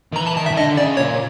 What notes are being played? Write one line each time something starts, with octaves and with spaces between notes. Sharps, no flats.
D#3
E3 A#5
A5
D#3 A5
E5
D#3
D3 D#5
C#3 D5
A#2 C#5